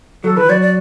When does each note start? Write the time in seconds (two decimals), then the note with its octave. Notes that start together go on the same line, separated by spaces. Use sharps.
0.24 F#3 A4
0.37 E3 B4
0.49 F#3 D5
0.62 D5